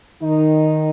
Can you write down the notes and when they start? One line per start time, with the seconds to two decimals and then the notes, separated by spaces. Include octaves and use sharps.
0.22 D#3 D#4